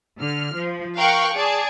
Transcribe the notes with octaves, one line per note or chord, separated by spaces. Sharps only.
D3 F6
F3
A#4 F5 G5 C#6 F#6
G#4 D5 A5